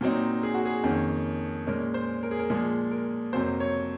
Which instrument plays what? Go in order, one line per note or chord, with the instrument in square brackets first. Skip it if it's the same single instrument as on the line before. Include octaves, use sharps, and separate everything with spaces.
[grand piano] A#2 F#3 C4 D#4
G#4
F#4
G#4
F2 D#3 A#3 C#4
A#2 G#3 C#4 A#4
C5
A#4
G#4
A#4
A#2 F3 G#3 G#4
A#4
F2 C3 F#3 A#3 C5
C#5